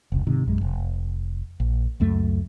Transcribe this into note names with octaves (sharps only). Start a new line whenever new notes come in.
F1 C#2
G#2 C3 D#3
A#1 F#2 G#3
F1
A#1
C#2 F#2 A3